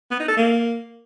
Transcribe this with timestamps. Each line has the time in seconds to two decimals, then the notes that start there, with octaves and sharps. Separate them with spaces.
0.11 B3
0.20 D#4
0.28 A4
0.37 A#3